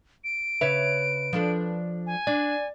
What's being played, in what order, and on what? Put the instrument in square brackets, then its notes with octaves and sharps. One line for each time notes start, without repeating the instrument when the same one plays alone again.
[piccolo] D7
[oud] C#3 C#5 E5 [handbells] B4
[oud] F3 D4 A4
[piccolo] G#5
[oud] D4 [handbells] D5